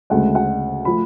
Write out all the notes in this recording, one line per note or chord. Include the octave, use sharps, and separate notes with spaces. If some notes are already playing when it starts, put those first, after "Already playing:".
D2 C#3 G#3 F#5
F#5
F3 A3 B5